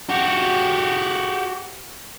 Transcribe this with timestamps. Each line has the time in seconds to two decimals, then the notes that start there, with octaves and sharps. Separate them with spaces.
0.09 F#4 G4